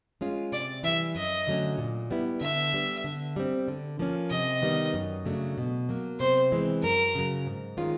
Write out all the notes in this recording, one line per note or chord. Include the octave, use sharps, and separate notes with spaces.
G#3 C#4 F4
C3 D5
E3 G3 E5
F#2 D#5
D3 F#3 A3 C#4
A#2
G3 B3 E4
D3 E5
G3 B3
D3
G3 C4
D3
F3 A#3 C#4
C3 D#5
D#3 G3 B3
F#2
C#3 F#3 A3 D4
B2
F#3 A#3
C3 C5
E3 G#3 C4
F#2 A#4
C#3 F#3
G#2
D#3 G#3 C#4 F4